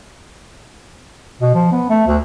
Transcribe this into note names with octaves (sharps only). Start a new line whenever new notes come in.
B2
F3
B3
A3
D2